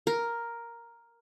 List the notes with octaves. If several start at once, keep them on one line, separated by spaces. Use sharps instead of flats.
A#4